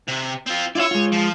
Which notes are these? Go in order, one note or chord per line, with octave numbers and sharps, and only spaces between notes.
C3
C4 F4
E4 F4 C#5 D5 E5
G#3 F4
F3